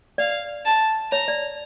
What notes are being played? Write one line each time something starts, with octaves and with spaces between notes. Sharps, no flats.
D5 F5
A5
C#5 A#5
D5